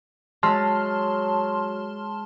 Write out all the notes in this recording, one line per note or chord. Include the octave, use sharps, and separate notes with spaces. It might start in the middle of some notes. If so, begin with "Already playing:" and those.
F#3 G#3 E5 A5 C6 F6